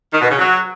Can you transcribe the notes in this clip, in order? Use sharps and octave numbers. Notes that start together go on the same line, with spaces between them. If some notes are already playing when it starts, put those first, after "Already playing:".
D#3
B2
C#3
F#3